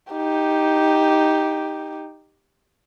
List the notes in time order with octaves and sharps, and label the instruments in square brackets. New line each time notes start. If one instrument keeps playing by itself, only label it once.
[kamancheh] D#4 G4